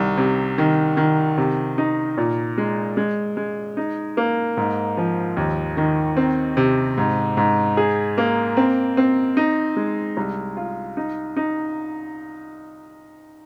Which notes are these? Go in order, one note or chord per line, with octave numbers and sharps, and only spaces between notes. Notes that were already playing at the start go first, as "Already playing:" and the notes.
Already playing: C2 D#3
C3
D#3
D#3
C3
D#4
A#2
G#3
G#3
G#3
D#4
A#3
G#2
F3
D#2
D#3
C4
C3
G#2
G#2
G#4
A#3
C4
C4
D#4
G#3
C2
F4
D#4
D#4